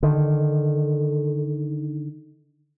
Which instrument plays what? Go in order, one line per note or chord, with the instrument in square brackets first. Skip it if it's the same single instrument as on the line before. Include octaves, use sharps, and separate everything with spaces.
[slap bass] D3 D#3